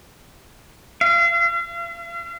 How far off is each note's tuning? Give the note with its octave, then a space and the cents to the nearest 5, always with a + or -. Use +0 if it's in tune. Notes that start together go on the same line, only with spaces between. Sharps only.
F5 -40